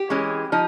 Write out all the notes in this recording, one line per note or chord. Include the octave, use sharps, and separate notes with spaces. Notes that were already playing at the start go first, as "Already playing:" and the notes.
Already playing: G4
E3 G#3 C#4
F3 D#4